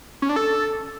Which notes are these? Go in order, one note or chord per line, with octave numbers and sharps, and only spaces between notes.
C#4
D4
A4